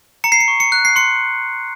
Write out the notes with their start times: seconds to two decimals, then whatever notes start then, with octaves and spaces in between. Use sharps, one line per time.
0.24 A#5 C#7
0.32 C7
0.40 C#7
0.48 C#6
0.60 C#7
0.72 F#6
0.85 C7
0.96 C6 C#7